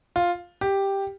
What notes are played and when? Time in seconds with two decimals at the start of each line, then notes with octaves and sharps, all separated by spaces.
0.16 F4
0.61 G4